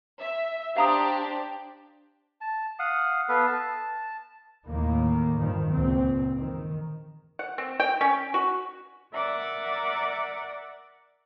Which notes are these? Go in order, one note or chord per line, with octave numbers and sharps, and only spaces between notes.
E5
D4 G4 C5 F5 A#5 D#6
A5
F5 F#5 D#6
B3 A4 B4 F5
A5
D#2 A2 D#3 A#3
G2 D#3 F3
C#2 A#2 C4
D#3
F#5
C4
G5
C#4
F#4
A#4 D5 E5 F#5 D6